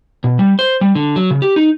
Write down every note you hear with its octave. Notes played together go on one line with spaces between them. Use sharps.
B2
G3
C5
G3
D3
F#3
C#3
G4
D#4